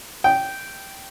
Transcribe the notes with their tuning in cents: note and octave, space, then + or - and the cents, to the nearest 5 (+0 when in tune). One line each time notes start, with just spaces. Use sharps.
G5 -10